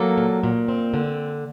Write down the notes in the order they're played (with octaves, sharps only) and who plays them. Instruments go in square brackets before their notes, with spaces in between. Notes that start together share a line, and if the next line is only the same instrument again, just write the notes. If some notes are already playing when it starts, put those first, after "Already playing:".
Already playing: [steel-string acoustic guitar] F#3 A#3 A4
A#2
A#2
C4
D3